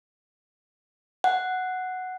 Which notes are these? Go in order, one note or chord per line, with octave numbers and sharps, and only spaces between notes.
F#5